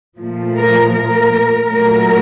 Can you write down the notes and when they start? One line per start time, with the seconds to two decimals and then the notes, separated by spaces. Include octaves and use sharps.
0.17 A#2 F3 A3
0.55 A#4
0.93 A#4
1.68 A#2 F#3 A3 A#4